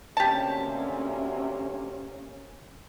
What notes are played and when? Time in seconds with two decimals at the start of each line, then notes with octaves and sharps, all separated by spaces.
0.17 D2 C3 A#3 C#4 G4 A5